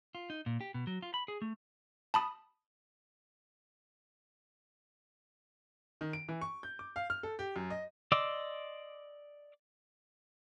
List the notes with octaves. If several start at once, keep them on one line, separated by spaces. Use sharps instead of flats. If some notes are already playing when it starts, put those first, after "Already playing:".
F4
D#4
A#2
G4
B2
F#3
F4
B5
G#4
A3
A5 B5 D#6
D#3
D7
E3
C#6
G6
D6
F5
F6
A4
G4
F#2
D#5
D5 D#5 C6 D6 E6